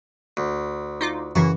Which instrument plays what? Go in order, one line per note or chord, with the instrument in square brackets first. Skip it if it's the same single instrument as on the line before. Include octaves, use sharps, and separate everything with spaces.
[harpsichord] D2
[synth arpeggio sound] D#4 F4 D6
[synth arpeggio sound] F#2 C#3 E3 [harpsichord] F#4